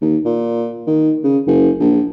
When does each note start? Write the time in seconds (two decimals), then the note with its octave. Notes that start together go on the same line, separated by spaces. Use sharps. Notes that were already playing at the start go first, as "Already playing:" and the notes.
0.02 D#2
0.25 A#2
0.87 D#3
1.24 C#3
1.47 F#1
1.79 A#1